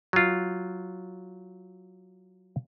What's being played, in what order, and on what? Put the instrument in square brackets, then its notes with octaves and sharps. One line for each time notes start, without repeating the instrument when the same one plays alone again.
[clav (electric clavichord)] F#3 F4